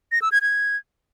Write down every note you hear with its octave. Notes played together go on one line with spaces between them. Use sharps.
A#6
E6
G#6
G#6